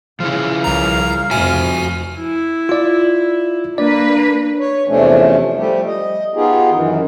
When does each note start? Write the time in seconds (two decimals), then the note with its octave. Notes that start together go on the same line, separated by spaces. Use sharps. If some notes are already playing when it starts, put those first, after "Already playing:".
0.20 C#3 F3 E4 F5
0.64 C2 A#5
1.31 F1 F2 F3 F#4 E5 G#5
2.18 E4
2.69 F4 D5
3.78 A#3 D4 B4 D5
4.60 C#5
4.88 E2 C3 F3 A3 C#4 D4
5.56 F3 G3 A3 G4
5.86 D#5
6.35 B3 D#4 F4 G4 G#4
6.70 F#2 D#3 E3